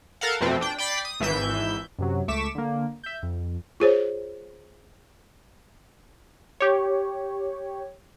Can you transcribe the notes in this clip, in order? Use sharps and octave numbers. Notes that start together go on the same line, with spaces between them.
A4 A#4 F5 F#5
F2 B2 A3 C4
D4 G5
D5 G5 B5 A6 B6 C7
D#6
G#1 E3 E5 G6
F#2 C3 F#3
C#2 A3 C#6 D6 B6 E7
D3 A#3
E5 G6
F2
F4 G#4 C5 C#5
G4 C#5